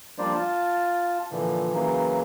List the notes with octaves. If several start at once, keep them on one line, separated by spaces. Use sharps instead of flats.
F3 G3 A#3 D4 C5 D5
F4 A5
A#2 D3 E3 F3
C#3 E3 F#3 A#3